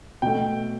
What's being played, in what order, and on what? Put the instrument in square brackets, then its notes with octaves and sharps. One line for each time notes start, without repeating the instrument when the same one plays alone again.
[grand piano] B2 A3 G5